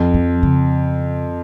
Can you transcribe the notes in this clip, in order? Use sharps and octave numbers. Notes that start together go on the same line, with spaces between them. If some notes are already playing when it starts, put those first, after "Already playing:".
Already playing: F2
F3
C#3